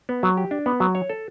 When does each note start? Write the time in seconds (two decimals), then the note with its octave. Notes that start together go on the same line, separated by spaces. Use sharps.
0.09 B3
0.23 F#3
0.37 G4
0.51 D4
0.66 B3
0.80 F#3
0.95 C#5
1.10 A4